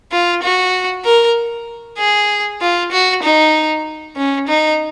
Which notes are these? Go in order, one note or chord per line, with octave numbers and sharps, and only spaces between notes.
F4
F#4
A#4
G#4
F4
F#4
D#4
C#4
D#4